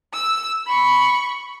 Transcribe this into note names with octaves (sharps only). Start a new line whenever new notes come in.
E6
B5 C#6